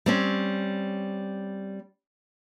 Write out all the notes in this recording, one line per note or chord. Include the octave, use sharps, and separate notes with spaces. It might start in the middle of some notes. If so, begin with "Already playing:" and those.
G3 C4 C#4